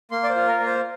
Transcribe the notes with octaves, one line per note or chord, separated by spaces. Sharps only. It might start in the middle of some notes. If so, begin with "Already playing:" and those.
A#3 C6
D5
C5
F4
A#4
A#3
C5